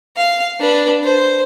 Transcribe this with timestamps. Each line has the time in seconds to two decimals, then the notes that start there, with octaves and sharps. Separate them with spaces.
0.17 F5
0.60 D4 B4
1.04 C5